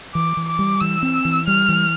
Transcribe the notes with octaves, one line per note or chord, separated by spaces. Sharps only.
E3 D6
E3
D6
G3
E3 E6
C4
E3
G3 F6
E3